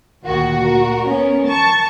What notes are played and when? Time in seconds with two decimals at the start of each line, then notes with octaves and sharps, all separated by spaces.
0.24 D2 A#2 D#3 F#4
0.64 A#4
1.07 B3 C#4
1.45 A5 C#6